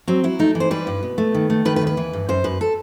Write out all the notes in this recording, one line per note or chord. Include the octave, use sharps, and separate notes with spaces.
F#3 C4
F#3 E4
A3 D#4
E3
C5
G3 B4
G2
B2
A3
D#3
A3
D#3 B4
B4
D#2
B4
E3
G2
F#2 C5
F#2 B4
A4